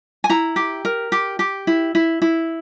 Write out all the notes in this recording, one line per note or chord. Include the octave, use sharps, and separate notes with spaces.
G#5
E4 A#5
G4
A#4
G4
G4
E4
E4
E4